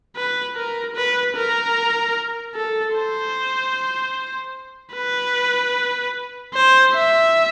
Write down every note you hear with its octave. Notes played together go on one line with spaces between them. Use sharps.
B4
A#4
B4
A#4
A4
C5
B4
C5
E5